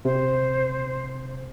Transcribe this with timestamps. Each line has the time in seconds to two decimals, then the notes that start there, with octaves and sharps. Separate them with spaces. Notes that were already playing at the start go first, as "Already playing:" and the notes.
0.05 C3 C5